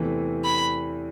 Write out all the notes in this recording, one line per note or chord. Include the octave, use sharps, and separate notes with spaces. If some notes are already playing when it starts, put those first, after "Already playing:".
Already playing: E2 C3 E3 A3
B5